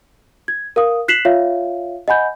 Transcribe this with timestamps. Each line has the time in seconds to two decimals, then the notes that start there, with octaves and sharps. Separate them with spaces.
0.48 G#6
0.76 A#4 F5 D#6
1.08 F#6 B6 C7 E7 F#7
1.25 F4 C#5 E5 F5
2.08 D#5 F#5 G#5 B5 G6